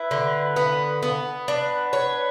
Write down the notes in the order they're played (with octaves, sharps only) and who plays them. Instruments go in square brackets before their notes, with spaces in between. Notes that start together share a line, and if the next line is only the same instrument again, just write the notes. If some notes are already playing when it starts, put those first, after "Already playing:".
Already playing: [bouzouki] E4 [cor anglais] B4
[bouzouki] D3
B3
B3
[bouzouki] D4 [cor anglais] B4
[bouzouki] C#5